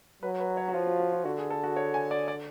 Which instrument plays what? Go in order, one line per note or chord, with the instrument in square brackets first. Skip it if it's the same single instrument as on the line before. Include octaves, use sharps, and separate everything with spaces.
[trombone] F#3 [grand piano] B4
[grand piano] B4
C#5
F#4
[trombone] F3 [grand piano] F4
[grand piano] F#4
F#4
F4
[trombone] D3 [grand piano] F#4
[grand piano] G#4
A4
F#4
C#5
G#5
D5
D5